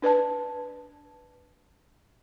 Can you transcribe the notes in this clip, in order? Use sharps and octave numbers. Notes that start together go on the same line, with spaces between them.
D4 B4 D5 A5